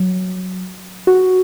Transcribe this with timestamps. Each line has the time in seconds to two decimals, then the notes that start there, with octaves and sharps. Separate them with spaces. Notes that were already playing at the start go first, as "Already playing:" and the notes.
Already playing: F#3
1.07 F#4